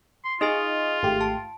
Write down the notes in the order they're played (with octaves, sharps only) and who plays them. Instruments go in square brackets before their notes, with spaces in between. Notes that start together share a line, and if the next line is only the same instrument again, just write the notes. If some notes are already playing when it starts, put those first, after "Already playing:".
[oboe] C6
[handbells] D#4 G#4 G#5 [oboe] F4 [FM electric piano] D#5
[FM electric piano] G#1 A3 G4
[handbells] A5